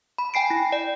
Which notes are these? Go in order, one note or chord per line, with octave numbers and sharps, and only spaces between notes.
B5
G5 G#5 C7 D7
E4
D5